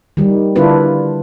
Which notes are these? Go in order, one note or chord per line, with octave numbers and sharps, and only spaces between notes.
D#3 G3
D3 D4 E4 F4 B4